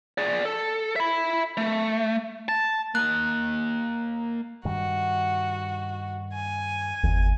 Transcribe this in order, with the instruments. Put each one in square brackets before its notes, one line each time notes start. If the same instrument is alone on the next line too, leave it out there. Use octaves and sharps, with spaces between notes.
[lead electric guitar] G#4 D5
A4
E5 B5
A3
A5
[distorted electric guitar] A#3 D#5 [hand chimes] F#6
[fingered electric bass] G2 D#3 G3 [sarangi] F#4
[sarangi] G#5
[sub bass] G1 [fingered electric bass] E2